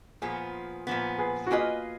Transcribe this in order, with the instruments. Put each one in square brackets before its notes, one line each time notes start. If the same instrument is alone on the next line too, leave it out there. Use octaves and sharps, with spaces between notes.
[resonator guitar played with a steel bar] A#2 F3 B3 [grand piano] G#4
[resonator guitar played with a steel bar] A#2 F3 B3
[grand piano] G#4 B4
F#4
[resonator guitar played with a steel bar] A#3 F4 B4 D#5 [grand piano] G#4